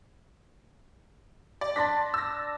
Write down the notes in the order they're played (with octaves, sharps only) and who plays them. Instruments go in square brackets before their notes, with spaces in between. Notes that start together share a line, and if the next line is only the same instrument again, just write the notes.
[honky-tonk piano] D5
[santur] D4 A5 [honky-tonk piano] C6 A#6 B6
[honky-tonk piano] E6 A#6